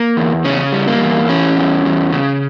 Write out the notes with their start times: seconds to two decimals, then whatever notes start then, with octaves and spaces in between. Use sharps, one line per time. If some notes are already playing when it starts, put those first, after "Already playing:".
Already playing: A#3
0.17 E2
0.44 C#3 C#4
0.73 G3
0.88 A#3
1.01 E2
1.29 E3 C#4
1.57 E2
1.85 E2
2.12 C#3